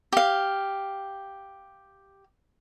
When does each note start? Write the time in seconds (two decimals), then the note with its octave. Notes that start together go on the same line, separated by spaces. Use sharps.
0.12 G4 F5